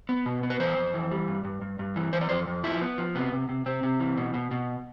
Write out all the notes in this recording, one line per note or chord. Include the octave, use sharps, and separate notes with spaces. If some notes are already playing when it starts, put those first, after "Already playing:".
B3
B2
B3
B4
E3 C5
F2
E3
G3
G2
G2
G2
G2
E3
E3 C5
D5
F2 C5
F2
F3 E4
B3
F3
C3 B3
C3
C3
C3 C4
C3
E3
B2
B2
B2